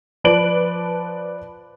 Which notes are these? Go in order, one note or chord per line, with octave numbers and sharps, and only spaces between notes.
F3 B4 D5 D7 F#7